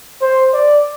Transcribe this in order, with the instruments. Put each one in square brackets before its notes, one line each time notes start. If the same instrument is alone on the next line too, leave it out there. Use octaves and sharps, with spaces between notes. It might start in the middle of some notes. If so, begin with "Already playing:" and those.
[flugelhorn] C5
D5